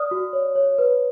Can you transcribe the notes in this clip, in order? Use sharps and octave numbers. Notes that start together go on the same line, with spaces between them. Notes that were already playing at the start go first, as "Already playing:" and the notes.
Already playing: D5 D#6 F6
F#4
C#5
C#5
B4